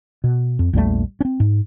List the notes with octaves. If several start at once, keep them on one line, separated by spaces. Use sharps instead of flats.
B2
F2
A#1 E2 G3 A3
C4 C#4
G#2